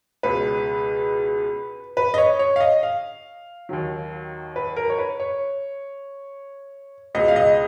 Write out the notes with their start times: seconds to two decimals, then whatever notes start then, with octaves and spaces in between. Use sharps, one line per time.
0.23 C#2 B2 G#3 B4
1.97 B4
2.14 D#5
2.18 C#5
2.39 C#5
2.56 F5
2.60 D#5
2.83 F5
3.69 D#2 D#3 F#3
4.56 B4
4.76 A#4
4.90 C#5
4.98 B4
5.20 C#5
7.15 C#2 B2 G#3 D#5
7.28 F5
7.36 D#5